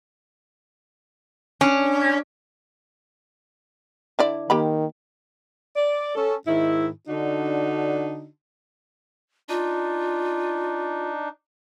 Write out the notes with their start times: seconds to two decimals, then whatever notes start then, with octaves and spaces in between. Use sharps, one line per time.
1.61 C#4 D4
4.19 D3 E4 D5
4.50 D#3 A#3 G4 B5
5.76 D5
6.15 C#4 A4
6.47 G#2 D#3 E4
7.08 D3 D4 D#4 F#4
9.49 D4 D#4 F4